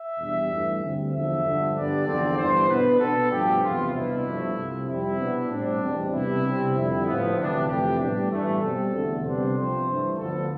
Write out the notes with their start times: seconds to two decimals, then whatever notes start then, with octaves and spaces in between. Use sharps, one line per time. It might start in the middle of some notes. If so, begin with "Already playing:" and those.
Already playing: E5
0.19 E2 B2 G3 D4
0.50 G2 E3 A3
0.82 D2 D3 G3 C4
1.13 E2 D3 F3 E5
1.44 G2 D3 F3
1.75 G2 D3 G3 B3 D4 D5
2.06 E2 D3 F3 C4
2.37 G2 E3 B3 D4 C5
2.69 B2 B3 D4 B4
2.99 B2 B3 D4 A4
3.31 G2 F3 A3 G4
3.62 E2 C3 F3 B3 F4
3.93 C2 B2 B3 D4 E4
4.24 G2 F3 A3
4.56 C2 C3 F3
4.87 F2 C3 G3 C4 E4
5.18 B2 B3 D4
5.49 A2 G3 C4 D4
5.81 E2 B2 G3 C4
6.11 C3 G3 B3 D4 E4
6.43 C3 G3 C4
6.74 F2 D3 G3 E4
7.05 A2 F3 B3
7.37 D2 C3 E3 G3 D4
7.68 F2 C3 E3 A3 G4
7.99 A2 G3 B3 D4
8.30 G2 E3 A3
8.61 B2 G3 C4 A4
8.93 E2 D3 A3
9.24 C3 G3 B3 D4 C5
9.55 C2 C3 F3 C4
9.86 G2 E3 A3 D4
10.17 D2 D3 F3 B3 A4